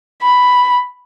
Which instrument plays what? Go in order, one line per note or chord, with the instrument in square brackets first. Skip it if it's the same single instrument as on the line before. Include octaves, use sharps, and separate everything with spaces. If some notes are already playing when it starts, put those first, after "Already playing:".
[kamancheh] B5